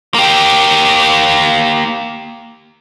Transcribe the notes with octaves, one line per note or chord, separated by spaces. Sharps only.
A#3 G4